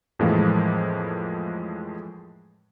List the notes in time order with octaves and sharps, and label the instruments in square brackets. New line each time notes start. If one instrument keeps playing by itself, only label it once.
[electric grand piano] F2 A2 E3 F3 G#3 A#3